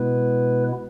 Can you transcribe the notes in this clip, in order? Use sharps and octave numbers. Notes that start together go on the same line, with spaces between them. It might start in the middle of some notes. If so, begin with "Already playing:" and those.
Already playing: B2 G#3 B3 E4 B4